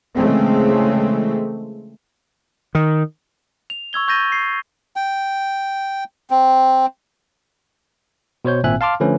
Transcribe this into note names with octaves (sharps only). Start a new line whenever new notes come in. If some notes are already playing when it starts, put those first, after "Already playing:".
C#3 E3 G#3 A3 C4
D#3
F7
C#6 E6 G#6 G7
C#6 G6 A6 A#6 D#7 G7
C7
G5
C4
B2 C5 C#5 G6
G#1 A#2 C4 E5 G#5 F#6
F5 A5 C6 D6 F6
D3 F3 A3 C#4 B4